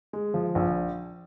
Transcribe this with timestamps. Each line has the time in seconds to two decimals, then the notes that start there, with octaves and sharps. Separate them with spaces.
0.13 G#3
0.34 F3
0.55 A#1